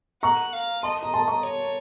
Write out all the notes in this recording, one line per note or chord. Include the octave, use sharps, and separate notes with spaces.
F#5 A#5 C#6
F5
D#5 A5 C6
A#5
A5 C6
A#5 C#6
C#5